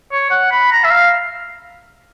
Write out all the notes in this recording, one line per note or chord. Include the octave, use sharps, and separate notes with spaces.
C#5
F#5
B5
A#5
E5
F5